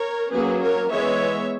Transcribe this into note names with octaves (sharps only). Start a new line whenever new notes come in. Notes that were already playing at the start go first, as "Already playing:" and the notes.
Already playing: A#4 C#5
F#3 A#3 C#4 G#4 B4
A#4 C#5
E3 G#3 B3 C#5 E5